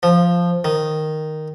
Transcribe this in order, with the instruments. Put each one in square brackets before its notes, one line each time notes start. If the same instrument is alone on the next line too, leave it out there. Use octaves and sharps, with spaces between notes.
[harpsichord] F3
D#3